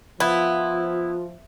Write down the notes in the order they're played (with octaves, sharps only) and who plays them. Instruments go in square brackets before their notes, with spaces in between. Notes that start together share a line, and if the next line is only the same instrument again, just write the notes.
[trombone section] F3 [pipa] B3 [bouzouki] E4 [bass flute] F4